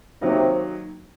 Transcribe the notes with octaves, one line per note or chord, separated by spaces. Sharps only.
C3 D#3 F#3 A#3 D#4